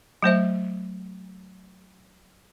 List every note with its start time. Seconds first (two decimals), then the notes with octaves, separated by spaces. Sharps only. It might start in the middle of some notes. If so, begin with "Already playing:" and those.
0.22 F#3 A3 C5 E5